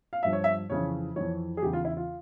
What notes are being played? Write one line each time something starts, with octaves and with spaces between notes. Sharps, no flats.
F5
G2 F3 E5
C#5
E5
F2 C#3 E3 C#5
F2 E3 C#5
G#4
E2 C#3 E3 G4
F4
E4
F4